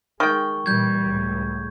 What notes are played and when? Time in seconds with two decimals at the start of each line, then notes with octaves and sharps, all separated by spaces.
0.20 D#3 G#3 G5 C#6
0.66 A#2 E3 G3 G6 G#6
1.03 C#2 A2